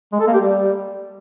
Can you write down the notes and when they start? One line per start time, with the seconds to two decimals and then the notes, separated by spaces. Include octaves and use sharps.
0.13 G#3
0.20 A4
0.27 A#3
0.34 G4
0.41 G3